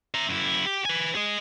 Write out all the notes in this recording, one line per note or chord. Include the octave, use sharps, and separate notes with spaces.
E5 A#5
F#2 E4
G4
B4 G#5
G#4 D#5